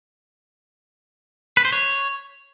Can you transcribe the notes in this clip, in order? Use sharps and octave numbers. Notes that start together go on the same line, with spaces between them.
B4
C5
C#5